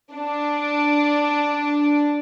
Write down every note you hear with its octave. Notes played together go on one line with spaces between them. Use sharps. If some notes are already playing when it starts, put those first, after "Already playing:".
D4